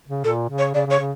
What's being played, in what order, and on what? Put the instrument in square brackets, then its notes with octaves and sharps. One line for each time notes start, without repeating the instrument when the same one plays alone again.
[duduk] C#3
[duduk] A#2 [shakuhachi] A4
[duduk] C#3
[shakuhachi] C#5
[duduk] C#3 [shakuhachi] D5
[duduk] C#3
[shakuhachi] C#5
[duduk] C#3